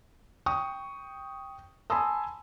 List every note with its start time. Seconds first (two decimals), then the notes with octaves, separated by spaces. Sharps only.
0.46 G5 C#6 D#6
1.90 G#5 A5 B5 C6 D#6 E6